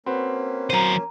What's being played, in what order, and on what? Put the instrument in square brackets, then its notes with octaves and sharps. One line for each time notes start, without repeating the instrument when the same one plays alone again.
[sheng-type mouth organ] A#3 C#4 [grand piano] C4 F#4 B4
[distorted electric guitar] F#3 C5 [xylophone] A#5 D#7